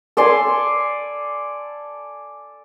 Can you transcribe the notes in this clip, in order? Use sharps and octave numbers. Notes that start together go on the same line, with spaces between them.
A4 D5 G#5 C6